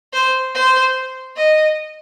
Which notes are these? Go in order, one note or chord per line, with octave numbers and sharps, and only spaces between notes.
C5
C5
D#5